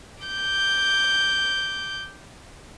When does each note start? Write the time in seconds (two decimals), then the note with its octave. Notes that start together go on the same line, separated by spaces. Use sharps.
0.24 D6 G6